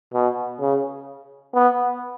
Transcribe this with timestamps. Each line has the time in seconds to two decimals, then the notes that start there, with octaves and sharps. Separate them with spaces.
0.14 B2
0.60 C#3
1.54 B3